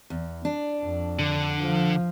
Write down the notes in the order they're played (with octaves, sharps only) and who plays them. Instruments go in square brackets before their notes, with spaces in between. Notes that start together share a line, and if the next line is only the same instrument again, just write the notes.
[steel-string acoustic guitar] E2
D4
[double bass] F2
[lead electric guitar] D3
[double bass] F3